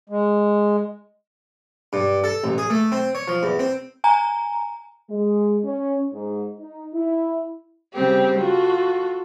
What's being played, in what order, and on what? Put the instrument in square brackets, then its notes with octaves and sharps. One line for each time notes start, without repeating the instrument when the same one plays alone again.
[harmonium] G#3
[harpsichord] G2
A4
A1
G#4
A3
C4
C#5
F3
E2
C4
[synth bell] G#5 A#5
[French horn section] G#3
C#4
G#2
D#4
E4
[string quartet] C#3 G3 C4 G4
F4 F#4 A4